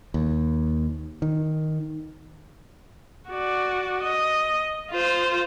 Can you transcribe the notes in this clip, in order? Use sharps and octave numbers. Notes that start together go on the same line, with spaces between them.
D#2
D#3
F#4 D5
D#5
F4 C5